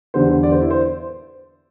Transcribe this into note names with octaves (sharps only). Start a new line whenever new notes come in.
E2 D3 G3 C5
D5
C5
E4
C5